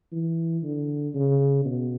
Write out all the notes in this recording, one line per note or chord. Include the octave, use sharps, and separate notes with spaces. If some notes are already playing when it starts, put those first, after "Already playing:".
E3
D3
C#3
B2